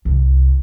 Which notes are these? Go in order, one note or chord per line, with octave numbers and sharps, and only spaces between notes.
C2